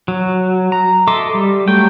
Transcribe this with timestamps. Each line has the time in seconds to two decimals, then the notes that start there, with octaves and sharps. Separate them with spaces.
0.08 F#3
0.72 A#5
1.07 A4 D#5 E5 C6 D6
1.34 G3
1.68 F#3 A3 G5